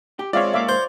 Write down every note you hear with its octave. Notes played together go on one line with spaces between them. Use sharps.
G4
G#3 C4 F4 C#5 D5 E5 F5
G#2 A#3 E5 F5 D6
C5